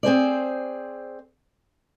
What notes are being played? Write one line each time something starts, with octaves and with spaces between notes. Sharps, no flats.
C4 G#4 C5 D5